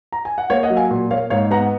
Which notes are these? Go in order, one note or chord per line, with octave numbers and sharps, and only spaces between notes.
A#5
G#5
F#5
A#3 C#5 F5
D#5 F#5
F#3
F5 G#5
A#2
A#3 C#5 F5
G#2 C#5 F5
B3 F#5 A#5